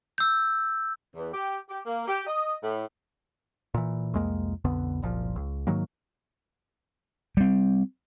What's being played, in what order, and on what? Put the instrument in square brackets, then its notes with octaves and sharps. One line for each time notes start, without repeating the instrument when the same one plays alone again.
[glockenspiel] E6 G6
[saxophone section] E2
G4
G4
A#3
G4
D#5
A2
[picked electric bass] A#2 E3
C2 F2 G#3 A#3
B1 F2 D3 B3
F#1 C2 A#2 F3
C#2
G#2 D#3 F#3 A#3
[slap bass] G3 C4